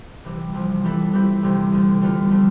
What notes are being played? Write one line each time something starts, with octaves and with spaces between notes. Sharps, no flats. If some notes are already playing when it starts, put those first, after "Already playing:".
C3 E3 G3
C2 C3 F3
E3 G3 B3 E4 A4
E3 G3 C4 E4 G4
D2 C3 G3 C4
D2 C3 G3
D3 G3 B3 F4
D3 F3 A3